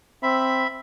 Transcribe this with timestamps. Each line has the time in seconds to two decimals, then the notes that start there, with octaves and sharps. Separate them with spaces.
0.23 C4 E5 B5